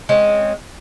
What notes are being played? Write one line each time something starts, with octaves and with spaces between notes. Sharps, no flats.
G#3 C4 C#4